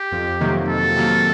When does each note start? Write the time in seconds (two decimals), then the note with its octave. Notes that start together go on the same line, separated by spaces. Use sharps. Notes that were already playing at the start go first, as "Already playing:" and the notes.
Already playing: G4
0.12 F2
0.41 C3 D#3 F#3 A#3
0.68 F2 A4
0.96 C3 D#3 F#3 A#3